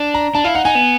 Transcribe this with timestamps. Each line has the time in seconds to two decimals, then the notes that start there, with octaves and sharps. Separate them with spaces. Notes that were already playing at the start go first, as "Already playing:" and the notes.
Already playing: D4
0.14 A#5
0.35 D4 A5
0.44 E4 F5
0.55 D#4 F#5
0.65 D#4 G#5
0.75 B3